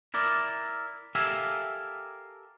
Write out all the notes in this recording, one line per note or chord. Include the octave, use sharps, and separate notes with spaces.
E4 A#4 D5
G4 A4 A#4 E5 F5 G#5